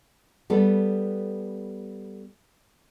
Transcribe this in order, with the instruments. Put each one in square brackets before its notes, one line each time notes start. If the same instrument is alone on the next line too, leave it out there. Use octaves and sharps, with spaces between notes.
[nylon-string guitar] G3 B3 A4